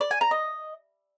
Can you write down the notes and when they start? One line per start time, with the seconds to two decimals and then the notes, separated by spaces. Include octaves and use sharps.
0.01 D5
0.11 G#5
0.21 A#5
0.31 D#5